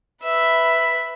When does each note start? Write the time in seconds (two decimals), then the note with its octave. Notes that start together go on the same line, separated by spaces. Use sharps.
0.23 B4 E5